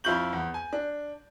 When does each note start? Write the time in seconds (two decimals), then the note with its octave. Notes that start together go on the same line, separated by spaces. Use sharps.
0.04 F2 E4 F4 C#6 G6 F#7
0.33 E2
0.54 G#5
0.73 D4